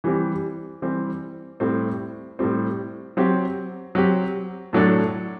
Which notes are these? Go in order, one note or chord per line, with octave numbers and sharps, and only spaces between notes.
E3 G3 C4 G4
E3 G3 C4 G4
A2 G3 C4
A2 G3 C4
F#3 C4 G4
F#3 C4 G4
A2 F#3 A3 D4 A4